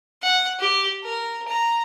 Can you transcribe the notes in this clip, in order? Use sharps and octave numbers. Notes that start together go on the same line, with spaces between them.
F#5
G4
A#4
A#5